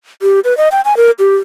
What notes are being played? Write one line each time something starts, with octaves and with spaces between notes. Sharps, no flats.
G4
B4
D#5
G5
G#5
A#4
G4